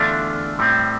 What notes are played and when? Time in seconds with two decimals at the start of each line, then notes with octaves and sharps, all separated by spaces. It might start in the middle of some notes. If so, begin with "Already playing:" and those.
Already playing: E2 D3 A3 D4 F4
0.59 A2 G3 C4